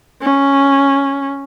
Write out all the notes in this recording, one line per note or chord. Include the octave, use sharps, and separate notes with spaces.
C#4